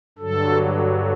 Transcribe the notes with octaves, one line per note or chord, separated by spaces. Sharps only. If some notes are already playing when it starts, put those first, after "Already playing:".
G2 D3 F#3 A4